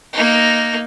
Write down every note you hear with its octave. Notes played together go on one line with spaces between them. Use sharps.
A#3 D#4